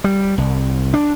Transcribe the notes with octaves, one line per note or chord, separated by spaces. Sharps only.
G3
C2
D4